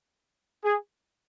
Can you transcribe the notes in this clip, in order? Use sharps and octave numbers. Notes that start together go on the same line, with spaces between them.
G#4